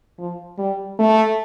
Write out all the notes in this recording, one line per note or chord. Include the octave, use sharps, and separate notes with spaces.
F3
G3
A3